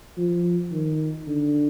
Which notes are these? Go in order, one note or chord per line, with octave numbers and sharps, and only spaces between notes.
F3
D#3
D3